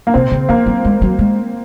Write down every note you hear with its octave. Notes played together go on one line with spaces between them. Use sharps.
A#3
C3 C4
C#3
F3 A#3
F#3
G#3
F#3
G#3